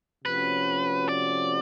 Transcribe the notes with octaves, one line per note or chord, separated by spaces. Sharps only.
C3 F3 A3 C#4 F#4 B4
D5